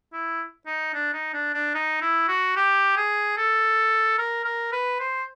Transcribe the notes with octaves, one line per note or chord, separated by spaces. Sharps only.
E4
D#4
D4
D#4
D4
D4
D#4
E4
F#4
G4
G#4
A4
A#4
A#4
B4
C5